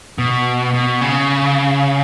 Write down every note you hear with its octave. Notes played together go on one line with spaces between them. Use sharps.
B2
B2
C#3